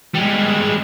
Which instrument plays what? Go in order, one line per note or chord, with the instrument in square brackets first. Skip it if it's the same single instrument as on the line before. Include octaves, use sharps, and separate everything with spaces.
[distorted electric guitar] G3 G#3